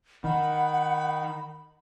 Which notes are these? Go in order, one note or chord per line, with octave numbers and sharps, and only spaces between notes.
D#3 F#5 B5